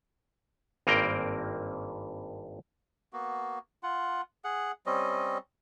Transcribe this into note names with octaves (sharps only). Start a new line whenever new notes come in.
G#1 G2 A#3 C4 A#4 G5
A#3 B3 F#4
F4 F#5
G#4 F#5
G3 C4 C#4 D#5